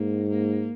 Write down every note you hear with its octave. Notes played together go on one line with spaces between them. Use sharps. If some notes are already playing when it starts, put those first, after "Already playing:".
Already playing: G#2 A#3
A#3